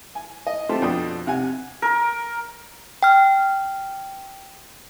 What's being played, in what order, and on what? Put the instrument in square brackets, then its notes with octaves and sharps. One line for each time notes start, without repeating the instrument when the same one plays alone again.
[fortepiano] G#5
D#5
A3 C4 F4 G4 A4
F2 B2 D4 G5 D#6
C3 F#5 G#5
[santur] A#4
[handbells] G5 F6